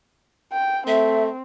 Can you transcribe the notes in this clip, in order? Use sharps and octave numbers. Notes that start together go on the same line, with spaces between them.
G5
A3 C4 E5